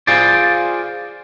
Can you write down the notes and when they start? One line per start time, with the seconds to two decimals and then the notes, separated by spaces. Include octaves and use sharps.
0.07 F4 G#4 C5 D5